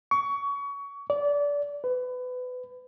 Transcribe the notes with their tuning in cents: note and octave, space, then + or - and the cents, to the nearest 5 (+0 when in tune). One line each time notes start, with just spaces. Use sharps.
C#6 +25
D5 -25
B4 +25